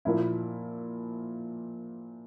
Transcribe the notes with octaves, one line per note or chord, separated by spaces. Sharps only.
A#2 F3 A#3 E4